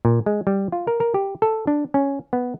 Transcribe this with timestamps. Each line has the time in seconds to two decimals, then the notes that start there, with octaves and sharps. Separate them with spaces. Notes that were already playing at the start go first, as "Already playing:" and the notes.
0.05 A#2
0.26 G#3
0.47 G3
0.72 F4
0.87 A#4
1.00 A#4
1.14 G4
1.42 A4
1.67 D4
1.94 C#4
2.33 B3